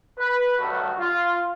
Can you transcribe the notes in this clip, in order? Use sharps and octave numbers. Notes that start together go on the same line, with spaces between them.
B4
G2 D#3 F#3 A3 F#4
F4